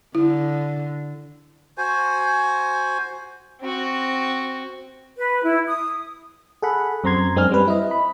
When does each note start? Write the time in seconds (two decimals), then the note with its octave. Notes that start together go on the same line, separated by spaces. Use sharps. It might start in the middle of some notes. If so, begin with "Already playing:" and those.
0.15 D3 E4
1.78 F#4 C5 G#5
3.61 C4 F#4
5.17 B4
5.43 E4
5.68 D#6
6.62 G#4 A4 F#5 B5
7.04 F#2 C4 A#5 C6 G#6
7.36 F#2 G#3 C4 D4 G#4 F6
7.51 G3 C4 B4
7.68 E4 D#5
7.91 B5